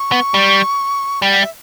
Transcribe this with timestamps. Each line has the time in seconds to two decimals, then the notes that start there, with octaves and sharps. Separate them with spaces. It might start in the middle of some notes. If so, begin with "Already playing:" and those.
Already playing: C#6
0.12 B3
0.34 G3
1.22 G3 G5
1.31 F#5
1.41 E5